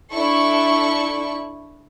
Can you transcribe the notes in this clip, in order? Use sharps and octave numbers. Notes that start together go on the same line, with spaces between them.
D4 E4 A4 C#6